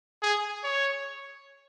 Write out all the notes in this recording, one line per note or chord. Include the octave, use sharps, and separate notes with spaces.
G#4
C#5